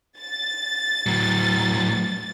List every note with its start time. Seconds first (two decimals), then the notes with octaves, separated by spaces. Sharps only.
0.19 A6
1.06 A2 F#3